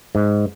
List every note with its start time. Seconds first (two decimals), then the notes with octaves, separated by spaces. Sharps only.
0.15 G#2